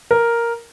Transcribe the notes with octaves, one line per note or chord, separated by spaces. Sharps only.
A#4